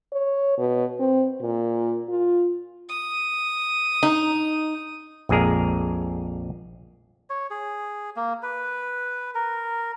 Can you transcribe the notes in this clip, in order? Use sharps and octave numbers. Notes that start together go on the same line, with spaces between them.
C#5
B2
C4
A#2
F4
D#6
D#4
A#1 F2 G#3 G#4 A#4
C#5
G#4
A#3
B4
A#4